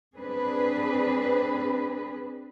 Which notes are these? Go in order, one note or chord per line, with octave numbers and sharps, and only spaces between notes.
C4 D4 G#4 B4